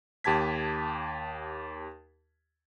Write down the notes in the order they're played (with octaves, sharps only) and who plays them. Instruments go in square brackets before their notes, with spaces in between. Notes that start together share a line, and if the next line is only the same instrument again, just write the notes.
[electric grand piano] D#2 G4 A5 G#6 B6